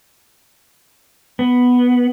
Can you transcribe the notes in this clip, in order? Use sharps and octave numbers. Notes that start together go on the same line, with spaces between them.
B3